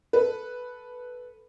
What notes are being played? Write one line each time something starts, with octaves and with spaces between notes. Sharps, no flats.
A4 B4